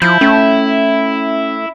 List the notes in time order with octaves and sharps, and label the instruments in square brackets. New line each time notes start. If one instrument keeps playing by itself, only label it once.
[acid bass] F3 [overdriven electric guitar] E4 [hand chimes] G6
[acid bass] A3 [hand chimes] C#4